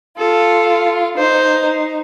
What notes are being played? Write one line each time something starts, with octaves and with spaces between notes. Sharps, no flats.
F4 A4
D#4 C5